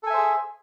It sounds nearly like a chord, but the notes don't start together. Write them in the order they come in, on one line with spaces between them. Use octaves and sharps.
A4 G#5 E5 C5 G#4